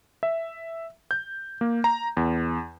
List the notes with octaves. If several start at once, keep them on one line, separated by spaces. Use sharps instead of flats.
E5
G6
A#3
A#5
E2